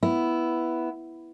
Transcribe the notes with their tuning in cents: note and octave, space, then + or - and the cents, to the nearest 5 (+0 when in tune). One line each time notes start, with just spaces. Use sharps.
B3 +0 E4 +5